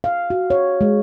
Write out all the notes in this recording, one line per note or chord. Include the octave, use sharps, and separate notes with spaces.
F5
F#4
C#5
G#3